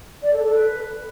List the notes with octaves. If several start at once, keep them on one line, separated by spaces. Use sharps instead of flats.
D5
A4
A4
B4